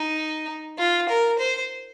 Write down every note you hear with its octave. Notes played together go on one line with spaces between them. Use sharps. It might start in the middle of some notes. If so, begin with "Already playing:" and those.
Already playing: D#4
F4
A#4
C5